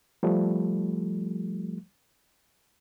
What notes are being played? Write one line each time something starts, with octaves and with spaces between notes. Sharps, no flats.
F3 G3 A3